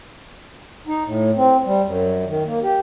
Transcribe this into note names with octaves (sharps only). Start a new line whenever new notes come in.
D#4
A2
C4
G3
F#2
D#3
A#3
G4